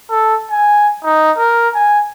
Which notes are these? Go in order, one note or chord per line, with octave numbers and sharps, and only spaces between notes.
A4
G#5
D#4
A#4
G#5